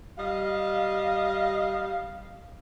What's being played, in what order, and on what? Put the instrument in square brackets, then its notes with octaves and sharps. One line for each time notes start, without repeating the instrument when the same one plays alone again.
[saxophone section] G3 D#5 F5